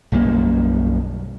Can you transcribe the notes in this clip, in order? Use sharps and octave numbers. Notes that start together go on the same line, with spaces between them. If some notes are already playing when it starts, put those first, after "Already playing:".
B1 F#2 G3 A#3